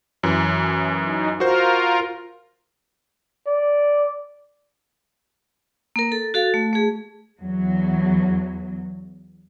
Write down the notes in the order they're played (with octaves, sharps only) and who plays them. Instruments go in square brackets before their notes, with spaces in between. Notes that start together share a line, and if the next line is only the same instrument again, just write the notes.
[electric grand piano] F#2 E3
[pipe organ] D#4
[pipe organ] F4 A#4 [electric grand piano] F#4 C5
[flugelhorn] D5
[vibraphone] A#3 A#4
A4
F#4 A4 F5
A3
A3 G#4
[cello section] E2 F#3